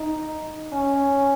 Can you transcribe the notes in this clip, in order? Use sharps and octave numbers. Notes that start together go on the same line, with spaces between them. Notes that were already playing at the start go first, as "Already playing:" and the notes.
Already playing: D#4
C#4